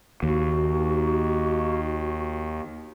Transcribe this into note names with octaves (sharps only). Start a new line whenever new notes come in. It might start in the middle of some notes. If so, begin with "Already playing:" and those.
D#2 F#4